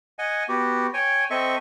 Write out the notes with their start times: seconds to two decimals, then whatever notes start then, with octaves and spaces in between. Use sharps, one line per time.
0.19 D#5 F#5 G#5
0.49 B3 F#4 G4
0.94 C#5 G5 G#5
1.30 C4 A4 D#5 E5 C#6